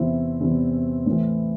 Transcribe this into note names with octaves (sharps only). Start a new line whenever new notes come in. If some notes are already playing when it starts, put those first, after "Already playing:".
Already playing: E2 C3 E3 C4 E4
E2 C3 E3
A2 E3